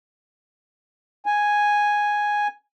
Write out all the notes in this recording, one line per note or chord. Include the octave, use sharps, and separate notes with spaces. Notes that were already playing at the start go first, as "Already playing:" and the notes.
G#5